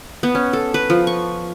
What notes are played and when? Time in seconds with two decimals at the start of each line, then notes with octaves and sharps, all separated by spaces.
0.23 B3
0.35 C#4
0.53 A4
0.74 B4
0.90 F3
1.07 C#6